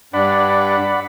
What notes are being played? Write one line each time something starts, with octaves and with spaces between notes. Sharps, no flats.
G2 D4 D5 F#5 B5